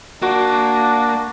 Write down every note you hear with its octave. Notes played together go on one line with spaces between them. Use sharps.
A#3 D4 F#4